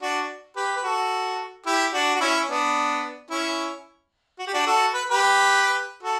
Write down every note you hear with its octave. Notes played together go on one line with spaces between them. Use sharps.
D4 F#4
G4 B4
B4
F#4 A4
E4 G4
D4 F#4
F#4
C#4 E4
B3 D4
C#4 E4
F#4
G4
D4 F#4
F#4 A4
B4
G4 B4
F#4 A4